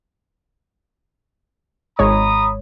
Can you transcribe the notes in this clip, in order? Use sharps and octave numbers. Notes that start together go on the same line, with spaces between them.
G#1 G#3 C#5 A#5 B5 D#6